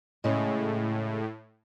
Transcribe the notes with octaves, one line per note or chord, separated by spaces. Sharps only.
A2 C#3 G#3